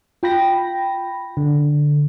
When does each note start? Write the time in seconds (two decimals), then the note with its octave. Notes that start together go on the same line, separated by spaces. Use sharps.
0.23 F4 G5 B5 A#6
1.37 D3